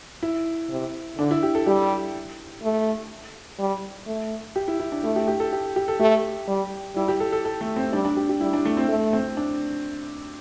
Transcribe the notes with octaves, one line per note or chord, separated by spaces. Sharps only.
E4
C3
D3 D4
E4
G4
A4
G3 G4
A3
G3
A3
G4
E4
E4
D4
A3 E4
G4
G4
A4
G4
G4
A4
A3 G4
G3
G3 E4
G4
A4
A4
A4
A3
C4
G3 D4
D4
G4
G4
G3 E4
D4
A3
C4
A3
C4
D4